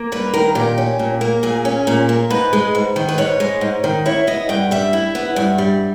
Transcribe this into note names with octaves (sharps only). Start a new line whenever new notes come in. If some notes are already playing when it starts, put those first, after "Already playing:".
Already playing: A#3
G2 B4
D#3 A#4
A#2 G4
C#4
A#2
A#3
A#2 G#4
C#4
A#2
A#3
G#2 B4
G#3
G#2
D#3
B4
G#2 C#5
G#3
G#2
D#3
E4 C#5
B3 D#5
G2 G5
G3 E5
E4
B3
G2
G3